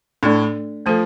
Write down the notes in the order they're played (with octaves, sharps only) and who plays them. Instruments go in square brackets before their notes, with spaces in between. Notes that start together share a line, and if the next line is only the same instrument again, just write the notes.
[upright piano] A2 [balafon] A3 D4 A4 D5
[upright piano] F3 [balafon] A3 F4 A4